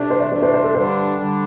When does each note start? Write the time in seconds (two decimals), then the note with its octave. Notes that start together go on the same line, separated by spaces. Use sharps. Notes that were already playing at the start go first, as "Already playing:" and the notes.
Already playing: C3 A3 D4
0.10 C5
0.20 D5
0.31 C3 A3 D4 C5
0.42 C5
0.54 C5
0.64 A4
0.75 G2 D3 G3 D4 C5
1.18 D3 G3 D4